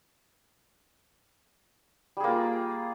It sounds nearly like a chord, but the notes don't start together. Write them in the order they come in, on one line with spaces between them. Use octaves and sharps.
G3 G#4 A#3 F4